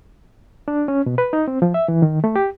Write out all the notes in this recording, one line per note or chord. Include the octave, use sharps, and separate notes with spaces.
D4
C#4
B2
B4
D#4
C4
F3
E5
E3
D#3
A3
G4